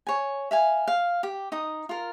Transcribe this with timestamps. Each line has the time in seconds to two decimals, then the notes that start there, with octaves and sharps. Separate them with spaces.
0.07 C#5 G#5
0.51 E5 F5 G#5
0.88 F5
1.23 G4
1.52 D#4 D#6
1.89 F4 A#4